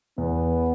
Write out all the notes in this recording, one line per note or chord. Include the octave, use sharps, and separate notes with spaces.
E2 B3